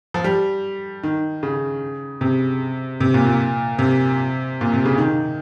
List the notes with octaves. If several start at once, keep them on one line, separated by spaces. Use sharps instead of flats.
F3
G3
D#3
C#3
C3
C3
A#2
A#2
C3
A#2
C3
C#3
D#3